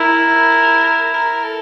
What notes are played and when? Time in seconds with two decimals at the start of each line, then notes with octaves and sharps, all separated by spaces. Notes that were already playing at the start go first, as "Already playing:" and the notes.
Already playing: E4 A#4
1.14 A#4
1.44 A4